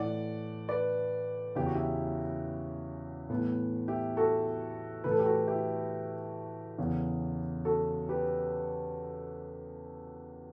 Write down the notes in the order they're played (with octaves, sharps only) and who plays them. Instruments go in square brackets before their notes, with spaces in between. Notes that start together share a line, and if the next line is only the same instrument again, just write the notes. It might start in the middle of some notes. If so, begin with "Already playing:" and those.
Already playing: [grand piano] A2 E3 D5 F#5
B4 D5
E2 C#3 E3 G4
F#4
E4 G4
A2 E3 B3
E4 G4
F#4 A4
A2 E3 B4
A4
G4
F#4 A4
E4 G4
E2 C#3 E3
F#4 A4
G4 B4